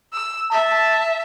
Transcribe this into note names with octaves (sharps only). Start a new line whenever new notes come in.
E6
E5 A5